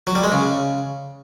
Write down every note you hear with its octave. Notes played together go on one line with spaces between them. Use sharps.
F#3
G3
G#3
C#3